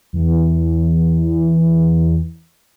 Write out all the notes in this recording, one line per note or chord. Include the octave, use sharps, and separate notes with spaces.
E2 E3